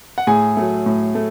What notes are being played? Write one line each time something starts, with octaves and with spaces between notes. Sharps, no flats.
F#5
A2 G#4 G#5
F#3 A3
A2
A3